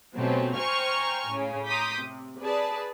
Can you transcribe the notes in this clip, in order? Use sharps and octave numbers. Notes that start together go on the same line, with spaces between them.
B2 F#3 A3 C4 C#4 G4
C5 G5 G#5 A#5 C#6 F6
A2 C#3
A#5 C6 D6 D#6 G6 B6
C3
G#4 B4 D5 A5